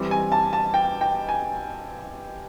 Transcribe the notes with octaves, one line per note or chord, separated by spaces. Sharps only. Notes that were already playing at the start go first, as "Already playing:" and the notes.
Already playing: E3 G3 C4
G#5
A5
A5
G5
G5
G#5